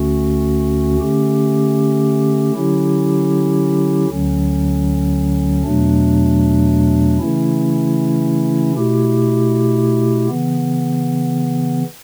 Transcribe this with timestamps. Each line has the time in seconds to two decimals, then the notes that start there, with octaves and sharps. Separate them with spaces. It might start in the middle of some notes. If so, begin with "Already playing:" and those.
Already playing: D2 D3 A3 C#4 F#4
1.00 D3 A3 C#4 G4
2.55 D3 F#3 C#4 E4 G4
4.10 D2 D3 F#3 C#4
5.64 E2 B2 F#3 A3 D4
7.19 C#3 E3 A3 C#4 E4
8.74 B2 A3 E4 G4
10.28 C#3 E3 B3